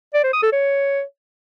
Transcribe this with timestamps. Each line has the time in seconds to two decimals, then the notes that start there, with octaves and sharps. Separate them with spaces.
0.14 D5
0.24 C5
0.33 D#6
0.43 A4
0.52 C#5